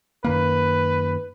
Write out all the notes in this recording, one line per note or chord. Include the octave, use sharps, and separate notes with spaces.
F#2 D#3 A#3 B4